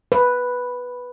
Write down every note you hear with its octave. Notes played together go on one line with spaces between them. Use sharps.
B4